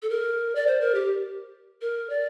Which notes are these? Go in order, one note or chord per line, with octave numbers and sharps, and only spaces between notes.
A4
A#4
D5
C5
A#4
G4
A#4
D5